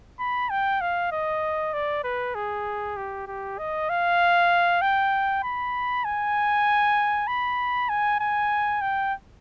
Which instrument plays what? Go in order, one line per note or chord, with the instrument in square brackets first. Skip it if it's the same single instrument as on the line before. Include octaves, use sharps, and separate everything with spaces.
[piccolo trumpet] B5
G5
F5
D#5
D5
B4
G#4
G4
G4
D#5
F5
G5
B5
G#5
B5
G#5
G#5
G5